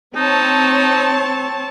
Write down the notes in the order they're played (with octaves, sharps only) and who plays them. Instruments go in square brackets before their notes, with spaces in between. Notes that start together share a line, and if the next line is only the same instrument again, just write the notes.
[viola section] C4 C#5 A5 [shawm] D#4